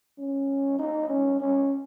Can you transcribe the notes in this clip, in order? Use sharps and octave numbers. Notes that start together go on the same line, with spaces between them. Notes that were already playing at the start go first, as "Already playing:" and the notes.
C#4
D#4
C#4
C#4